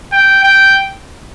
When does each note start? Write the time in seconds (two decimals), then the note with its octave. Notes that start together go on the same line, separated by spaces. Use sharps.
0.12 G5
0.44 G5